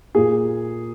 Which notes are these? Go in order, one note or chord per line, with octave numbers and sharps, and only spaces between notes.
A#2 A#3 G#4